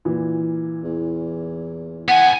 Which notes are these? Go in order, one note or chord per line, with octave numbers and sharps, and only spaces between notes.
A#2 E3
E2
B3 F#5 G#5